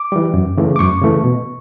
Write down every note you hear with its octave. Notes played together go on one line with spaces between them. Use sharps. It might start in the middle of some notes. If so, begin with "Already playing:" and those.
Already playing: D6
E3 G3
F#2
C#3 E3 A3
D6
F#2 C#6
C#3 E3 A3
B2